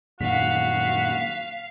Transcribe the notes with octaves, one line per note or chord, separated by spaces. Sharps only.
F#2 A#2 D#3 F#4 F5 B6